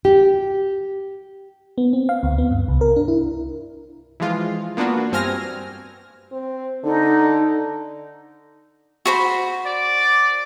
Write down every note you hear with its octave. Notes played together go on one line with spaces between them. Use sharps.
G4
B3
C4
F5
D2
B3
G2
C2
A#4
D4
E4
E3 F3 G#3 F4
A#3 B3 D4 F4 F#4
G2 C4 G#5 F6 A#6
C4
D3 D#4
F#4 C5 B5
D5